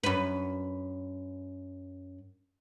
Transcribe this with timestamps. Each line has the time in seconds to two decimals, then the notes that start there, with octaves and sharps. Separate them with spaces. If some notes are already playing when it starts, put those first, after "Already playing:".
0.03 F#2 B4